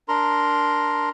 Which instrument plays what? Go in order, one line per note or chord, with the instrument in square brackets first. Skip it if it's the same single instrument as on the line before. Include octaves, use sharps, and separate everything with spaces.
[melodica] D4 A#4 A#5 C6